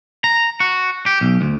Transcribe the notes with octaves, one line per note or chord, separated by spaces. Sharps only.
A#5
F#4
G4
B1
D2